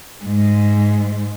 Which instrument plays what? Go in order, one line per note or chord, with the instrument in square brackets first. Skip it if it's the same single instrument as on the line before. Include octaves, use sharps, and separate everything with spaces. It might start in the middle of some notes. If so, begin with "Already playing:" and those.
[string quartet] G#2